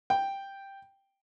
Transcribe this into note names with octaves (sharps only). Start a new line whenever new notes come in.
G5